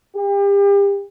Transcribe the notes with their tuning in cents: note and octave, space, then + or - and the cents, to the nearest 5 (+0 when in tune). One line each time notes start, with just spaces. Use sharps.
G4 +35